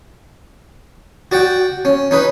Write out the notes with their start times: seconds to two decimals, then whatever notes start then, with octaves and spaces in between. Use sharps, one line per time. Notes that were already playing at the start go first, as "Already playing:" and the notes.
1.32 F#4 D5 F#5 G5
1.85 C#4
2.11 C#4 D#4 B4